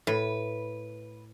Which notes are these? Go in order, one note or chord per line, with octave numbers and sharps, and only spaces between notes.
A2 B4